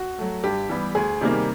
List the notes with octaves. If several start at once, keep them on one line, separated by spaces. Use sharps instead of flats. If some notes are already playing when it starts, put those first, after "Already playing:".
Already playing: F#4
F#3 A3
G2 G4
E3 G3 B3
D2 G#4
C3 D#3 G3 A#3